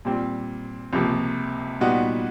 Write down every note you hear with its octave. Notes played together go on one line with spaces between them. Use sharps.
A#2 G3 C4
C#2 C3 F3 A#3
A#2 G3 B3 D#4 F#4